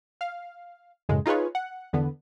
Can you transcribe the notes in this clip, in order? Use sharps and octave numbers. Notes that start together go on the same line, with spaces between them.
F5
F#2 A2 C#3 G#3
D#4 F4 G#4 B4 C#5
F#5
E2 D3 B3